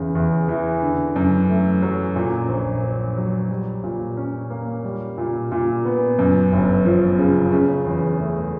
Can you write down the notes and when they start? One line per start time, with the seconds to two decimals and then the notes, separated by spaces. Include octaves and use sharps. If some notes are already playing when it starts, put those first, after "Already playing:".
Already playing: E2 C#3
0.15 E2
0.48 E3
0.82 D3
1.16 F#2
1.49 A3
1.82 F#3
2.16 A#2
2.49 A#1
2.83 A#1
3.17 F#3
3.50 G3
3.84 A#2
4.17 C#4
4.50 A#3
4.84 G3
5.18 A#2
5.52 A#2
5.85 B3
6.19 F#2
6.52 G1
6.85 F3
7.18 C#3
7.52 C#3
7.86 E2
8.19 A3